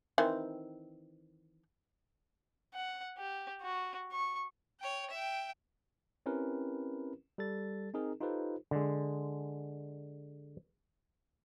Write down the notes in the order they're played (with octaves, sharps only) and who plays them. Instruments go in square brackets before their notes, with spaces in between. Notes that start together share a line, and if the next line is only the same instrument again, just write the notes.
[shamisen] D#3 E3 C4
[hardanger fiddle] F#5
G4
F#4
C#6
[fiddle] C#5 G5
E5 G5
[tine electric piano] C4 C#4 E4 G4 A#4 B4
G3 A4 A6
C4 D#4 G#4 A#4
D#4 F4 G4 A4 B4 C5
[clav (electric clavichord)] D3 G#3